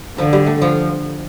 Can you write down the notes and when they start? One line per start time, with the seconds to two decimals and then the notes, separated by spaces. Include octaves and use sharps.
0.18 D3 F3
0.33 G3
0.47 A3
0.62 F3